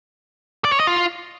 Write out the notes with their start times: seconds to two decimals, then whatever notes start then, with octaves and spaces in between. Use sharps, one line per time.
0.65 D5
0.72 C#5
0.80 D#5
0.87 F4